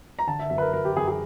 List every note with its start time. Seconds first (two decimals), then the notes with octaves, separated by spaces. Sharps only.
0.19 A#5
0.27 D3 A5
0.40 E5
0.50 F#2 E5
0.58 B4
0.62 A#4
0.73 F#3 A#4
0.85 G4
0.97 F#2 G#4
1.08 G#4